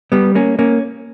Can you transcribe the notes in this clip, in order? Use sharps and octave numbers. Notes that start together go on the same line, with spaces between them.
G3 B3
A#3 C#4
A#3 C#4